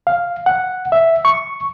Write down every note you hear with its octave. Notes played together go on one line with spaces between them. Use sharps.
F5
F#5
E5
C#6